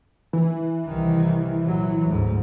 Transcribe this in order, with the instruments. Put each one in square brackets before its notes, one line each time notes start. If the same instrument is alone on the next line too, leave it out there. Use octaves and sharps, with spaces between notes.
[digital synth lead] E3
[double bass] C2 D#3
A#2 F#3
D2 G#2